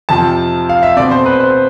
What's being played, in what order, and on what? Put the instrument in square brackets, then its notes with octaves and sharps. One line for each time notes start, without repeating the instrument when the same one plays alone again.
[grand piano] F2 C3 F3 A5
F5
E5
B2 A3 C4 D5
C5
B4
C5